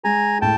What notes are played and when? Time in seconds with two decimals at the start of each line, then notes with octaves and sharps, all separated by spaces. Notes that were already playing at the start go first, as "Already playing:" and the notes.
0.04 G#3 G#5 A#5
0.41 A2 G5 A5